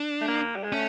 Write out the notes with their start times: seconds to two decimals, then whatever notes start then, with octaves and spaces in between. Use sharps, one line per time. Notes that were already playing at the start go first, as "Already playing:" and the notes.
Already playing: D4
0.21 A3
0.28 A#3
0.56 G3
0.64 G#3
0.72 A3 C#4